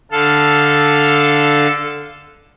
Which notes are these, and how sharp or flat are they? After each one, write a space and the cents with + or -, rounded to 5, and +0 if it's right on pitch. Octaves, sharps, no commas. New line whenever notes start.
D3 +0 A4 +0 F5 +0